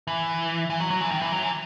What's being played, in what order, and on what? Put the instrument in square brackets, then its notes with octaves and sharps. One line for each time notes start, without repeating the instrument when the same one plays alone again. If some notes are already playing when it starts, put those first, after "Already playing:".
[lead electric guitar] E3
E3
F#3
F#3
E3
D#3
E3
F#3
E3